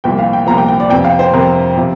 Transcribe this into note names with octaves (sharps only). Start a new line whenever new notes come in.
C2 A#2 F3 G5
F5
G5
C2 A#2 F3 A#5
G5
G5
D5
F2 C3 F3 G5
F5
C5
F2 C3 F3 A#4
C3 F3